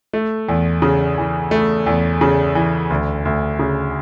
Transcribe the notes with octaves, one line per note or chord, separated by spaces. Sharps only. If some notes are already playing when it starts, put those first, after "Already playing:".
A3
E2
C#3
E3
A3
E2
C#3
E3
D2
D2
C#3